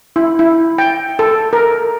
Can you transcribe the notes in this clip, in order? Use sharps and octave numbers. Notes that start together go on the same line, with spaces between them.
E4
E4
G5
A4
A#4